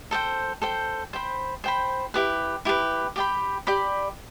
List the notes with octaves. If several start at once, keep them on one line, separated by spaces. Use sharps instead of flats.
A4 C5 G5
A4 C5 G5
C5 G5 B5
C5 G5 B5
E4 G4 B4
E4 G4 B4
G4 D5 G5 B5
G4 D5 G5 B5